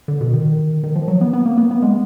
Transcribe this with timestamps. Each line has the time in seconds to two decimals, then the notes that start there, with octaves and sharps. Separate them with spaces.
0.08 D3
0.21 B2
0.33 D#3
0.83 D#3
0.96 F3
1.08 F#3
1.21 B3
1.33 B3
1.46 A#3
1.58 B3
1.71 B3
1.82 G#3